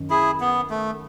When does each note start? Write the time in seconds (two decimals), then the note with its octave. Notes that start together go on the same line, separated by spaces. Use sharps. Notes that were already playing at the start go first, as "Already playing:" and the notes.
Already playing: F#2 D#3
0.10 E4 G#4
0.40 B3
0.70 A3